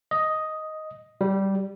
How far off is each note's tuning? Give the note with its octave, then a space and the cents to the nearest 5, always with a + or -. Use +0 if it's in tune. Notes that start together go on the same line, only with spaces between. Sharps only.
D#5 +5
G3 -10